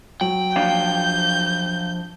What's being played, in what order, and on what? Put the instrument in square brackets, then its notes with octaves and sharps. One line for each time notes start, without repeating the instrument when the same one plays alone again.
[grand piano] F#3 F#7 [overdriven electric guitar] G5
[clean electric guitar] F3 D4 F5 [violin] G6